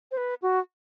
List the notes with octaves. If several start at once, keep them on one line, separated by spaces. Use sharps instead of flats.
C5
B4
F#4